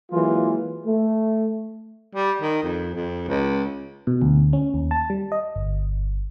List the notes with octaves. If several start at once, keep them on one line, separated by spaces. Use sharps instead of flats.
E3 F#3 G#3 A#3 F4
A3
G3
D#3
F2
F2
C#2
B2
D2
C#4
D#2
A5
G3
D#5
G1